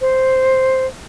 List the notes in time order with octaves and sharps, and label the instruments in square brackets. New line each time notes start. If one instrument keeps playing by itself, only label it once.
[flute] C5